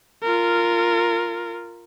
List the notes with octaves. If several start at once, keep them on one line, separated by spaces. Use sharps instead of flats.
F4 A#4